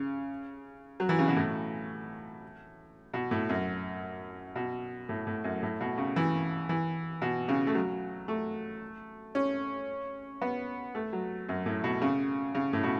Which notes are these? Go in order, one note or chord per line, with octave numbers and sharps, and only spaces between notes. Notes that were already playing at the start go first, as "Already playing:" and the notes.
Already playing: C#3
F#3
E3
C#3
B2
A2
B2
A2
F#2
B2
A2
A2
F#2
A2
B2
C#3
E3
E3
B2
C#3
A3
F#3
A3
C#4
B3
A3
F#3
F#2
A2
B2
C#3
C#3
A2
B2